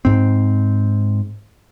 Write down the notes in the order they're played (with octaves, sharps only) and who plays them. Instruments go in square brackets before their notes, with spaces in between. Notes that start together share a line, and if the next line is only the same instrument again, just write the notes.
[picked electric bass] G#2 C4